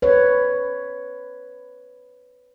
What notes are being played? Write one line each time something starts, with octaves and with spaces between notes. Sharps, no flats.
B4 C#5